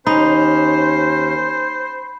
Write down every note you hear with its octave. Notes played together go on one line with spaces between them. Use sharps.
D#2 C#4 D#4 C5 B5